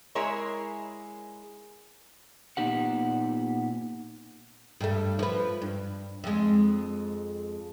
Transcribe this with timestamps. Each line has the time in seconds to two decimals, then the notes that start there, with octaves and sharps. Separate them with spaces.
0.15 G#3 E4 G#4 A#4 C#5
2.57 A#2 B3 D#4 G4 F#5
4.81 G2 A3
5.19 F3 B4
5.62 G2
6.24 F2 G#3